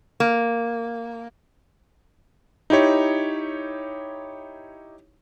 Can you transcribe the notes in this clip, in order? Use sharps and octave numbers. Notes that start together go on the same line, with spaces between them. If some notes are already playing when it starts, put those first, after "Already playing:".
A#3
D#4 E4 G4 C#5